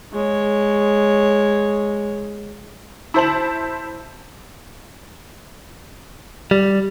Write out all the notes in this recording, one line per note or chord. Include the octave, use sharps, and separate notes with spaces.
G#3 C#5
E4 C5 A5 F#7
G3